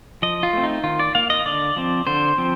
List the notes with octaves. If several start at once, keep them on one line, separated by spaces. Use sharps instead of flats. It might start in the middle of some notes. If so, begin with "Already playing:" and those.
F3 D#5
F4
A3 C4
D#4
D#3 F4
D5
A#3 F5
D#5
D3 D5
F3 C4
D3 C5
F3 C4